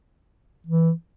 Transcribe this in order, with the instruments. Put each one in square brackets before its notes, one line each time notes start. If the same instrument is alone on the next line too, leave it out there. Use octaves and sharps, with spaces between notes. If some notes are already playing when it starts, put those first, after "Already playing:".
[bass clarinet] E3